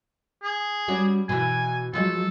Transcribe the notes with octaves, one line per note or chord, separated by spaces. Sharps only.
G#4
G3 C#4 F#4
B2 E3 G#5
F3 F#3 G#3 A4